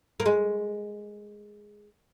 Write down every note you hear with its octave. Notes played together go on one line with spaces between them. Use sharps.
A#3
G#3